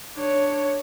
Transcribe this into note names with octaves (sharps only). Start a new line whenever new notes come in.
D4 C#5